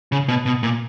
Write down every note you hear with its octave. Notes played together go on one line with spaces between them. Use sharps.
C#3
B2
B2
A#2